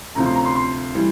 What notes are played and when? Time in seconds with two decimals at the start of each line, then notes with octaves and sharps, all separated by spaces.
0.15 D2 C3 F3 A#5
0.25 C6
0.35 A#5
0.45 C6
0.55 C6
0.95 E3 G3